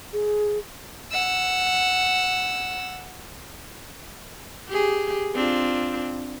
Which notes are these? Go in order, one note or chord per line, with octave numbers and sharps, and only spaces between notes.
G#4
F#5 E6
G4 G#4
C4 D4 F4